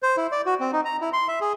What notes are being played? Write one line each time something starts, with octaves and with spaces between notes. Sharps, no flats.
C5
E4
D5
F#4
C4
D#4
A#5
E4
C6
E5
G#4